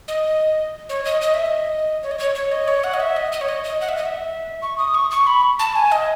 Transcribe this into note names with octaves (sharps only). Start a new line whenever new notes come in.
D#5
C#5
D#5
D#5
E5
D#5
C#5
D#5
C#5
C#5
D#5
C#5
F#5
D#5
E5
D#5
D#5
C#5
D#5
D#5
F#5
E5
D#5
E5
C#6
D#6
C#6
C#6
B5
A5
G#5
D#5